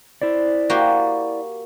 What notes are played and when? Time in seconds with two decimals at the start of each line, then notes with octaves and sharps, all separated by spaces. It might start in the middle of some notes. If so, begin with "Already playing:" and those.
0.22 E4 C5 D5
0.70 A#3 F#4 G4